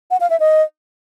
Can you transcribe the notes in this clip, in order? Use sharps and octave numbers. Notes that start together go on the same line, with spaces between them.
F#5
F5
E5
D#5